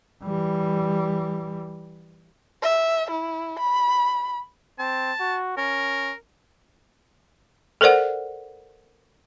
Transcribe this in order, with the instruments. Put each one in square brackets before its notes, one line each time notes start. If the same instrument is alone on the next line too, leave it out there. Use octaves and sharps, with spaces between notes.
[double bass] E3 G3
[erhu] E5
E4
B5
[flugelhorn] C4 [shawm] A5
[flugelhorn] F#4
[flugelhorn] C#4 [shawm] A#4
[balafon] A4 A#4 C5 D5 F#5